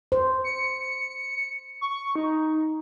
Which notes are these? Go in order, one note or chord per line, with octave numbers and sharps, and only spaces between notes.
C5
C#7
C#6
D#4